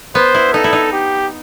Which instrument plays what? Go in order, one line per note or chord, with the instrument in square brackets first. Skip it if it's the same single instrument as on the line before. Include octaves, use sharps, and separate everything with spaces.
[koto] B3 [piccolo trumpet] C5
[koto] E4
[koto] D#4 [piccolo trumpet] A4
[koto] E4
D#4
[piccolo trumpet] G4